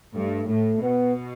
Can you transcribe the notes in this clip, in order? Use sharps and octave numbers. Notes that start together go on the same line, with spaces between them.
G2 A3
A2 A3
B2 B3